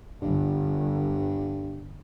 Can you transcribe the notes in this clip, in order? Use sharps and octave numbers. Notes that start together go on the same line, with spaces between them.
G1 G2